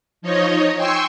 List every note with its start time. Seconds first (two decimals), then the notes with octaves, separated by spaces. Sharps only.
0.22 F3 D#4 C#5 D#5
0.76 G5 G#5 C6 C#6 E6